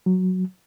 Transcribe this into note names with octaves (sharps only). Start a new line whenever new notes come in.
F#3